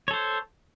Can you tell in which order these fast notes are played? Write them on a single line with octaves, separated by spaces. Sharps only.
C#5 A4 C5